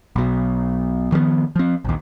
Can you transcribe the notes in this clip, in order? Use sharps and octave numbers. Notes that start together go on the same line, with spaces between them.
B1 B2
D#3 F3 G#3 B3
F3 C4
A#1 D#2